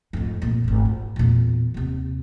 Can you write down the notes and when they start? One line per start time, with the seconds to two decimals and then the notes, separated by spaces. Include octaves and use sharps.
0.13 F2 G#2
0.42 F2 A#2
0.64 D1 G#1
0.85 F4
1.16 E2 A#2
1.74 D#2 C3